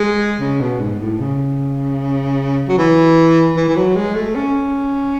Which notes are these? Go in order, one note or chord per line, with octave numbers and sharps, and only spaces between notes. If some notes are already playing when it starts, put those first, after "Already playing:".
Already playing: G#3
C#3
B2
G#2
A2
C#3
F#3
E3
E3
E3
F#3
G#3
A3
C#4